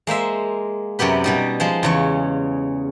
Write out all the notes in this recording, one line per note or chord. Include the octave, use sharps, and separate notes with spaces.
G#3 A#3 C5 E5
F#2 C3 B3 G4 B4
B2 G3 D#4
F3 G#3 C5
E2 C#3 C#5